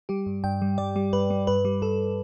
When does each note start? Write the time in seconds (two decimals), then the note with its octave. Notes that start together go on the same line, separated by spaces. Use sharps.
0.09 G3 G4
0.26 G2
0.44 G2 G5
0.62 G3
0.78 G2 D5
0.96 G3
1.13 G2 B4
1.30 G3
1.47 G2 B4
1.65 G3
1.82 G2 A4